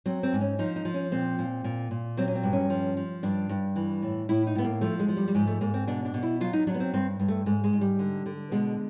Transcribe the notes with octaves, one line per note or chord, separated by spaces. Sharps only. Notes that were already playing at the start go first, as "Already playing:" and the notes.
F#3 C4
C4
G#2
C#4
F3 D#4
D#4
F3
C#4
A#2 C4
A#2
A#2
A#2
F#3 C4
C#4
C4
G2
C#4
F3
F3
G2 D4
G2
E3
A2
A2 E4
D#4
A2 B3
A#3
F3 A3
G#3
F3
G3
G3
G#2 G#3
A3
G#2 A#3
C4
B2 D4
D4
B2
E4
F#3 F4
D#4
F#3 D4
B3
C4
G2 C4
G2
A3
G#2 G#3
G#3
G#2
G3
D3
D3
B2 G#3